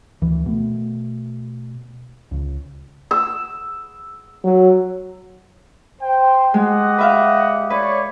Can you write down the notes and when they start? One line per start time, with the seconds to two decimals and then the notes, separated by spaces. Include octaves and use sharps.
0.22 D2 D#3 E3
0.46 B2 A3
2.31 C#2 C#3
3.11 E6
4.44 F#3
6.02 C5 G5
6.54 G#3 G4 D#5 F#5
6.98 B4 E5 F5
7.70 B4 C#5 D5